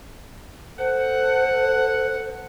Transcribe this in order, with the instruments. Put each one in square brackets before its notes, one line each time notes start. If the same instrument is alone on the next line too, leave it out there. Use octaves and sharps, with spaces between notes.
[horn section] A4 F#5 [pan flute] C5